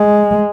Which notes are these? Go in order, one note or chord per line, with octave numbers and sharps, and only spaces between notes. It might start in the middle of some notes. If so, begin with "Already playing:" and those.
Already playing: G#3